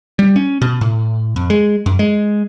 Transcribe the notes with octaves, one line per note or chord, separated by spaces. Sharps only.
G3
C#4
B2
A2
F2
G#3
F#2
G#3